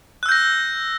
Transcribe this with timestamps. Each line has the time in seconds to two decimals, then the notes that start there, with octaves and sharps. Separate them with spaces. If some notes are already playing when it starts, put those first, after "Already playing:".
0.23 F#6
0.26 E6
0.29 G6
0.32 A#6